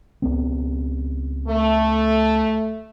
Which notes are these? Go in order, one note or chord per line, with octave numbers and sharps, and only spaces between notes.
C#2 B3 C4
A3